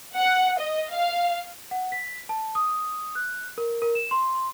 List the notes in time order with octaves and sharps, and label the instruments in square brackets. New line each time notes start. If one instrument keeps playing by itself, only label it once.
[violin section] F#5
D#5
F5
[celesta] F#5
B6
A5
D#6
F#6
A#4
A#4
E7
C6
C6